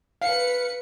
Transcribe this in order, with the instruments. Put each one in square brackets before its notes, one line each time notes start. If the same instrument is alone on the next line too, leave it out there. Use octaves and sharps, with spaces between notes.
[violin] B4 C#7 [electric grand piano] F5